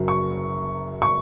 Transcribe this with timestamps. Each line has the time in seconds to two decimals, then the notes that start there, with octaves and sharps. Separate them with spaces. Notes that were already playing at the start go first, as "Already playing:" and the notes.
Already playing: F#1 F#2 F#3
0.08 C#6
1.02 C#6